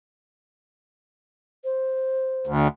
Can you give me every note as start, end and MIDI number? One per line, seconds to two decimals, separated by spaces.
1.64 2.51 72
2.47 2.68 38